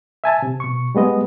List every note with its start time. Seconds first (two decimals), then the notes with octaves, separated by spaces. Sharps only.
0.24 E5 G#5 A5
0.42 C3
0.60 B2 C#6
0.95 G3 G#3 B3 D#5